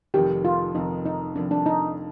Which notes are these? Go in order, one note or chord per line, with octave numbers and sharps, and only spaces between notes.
F1 F2 D#3 G4
F4
F1 F2 D#3 D#4
D#4
F1 F2 D#3 D4
D4
D#4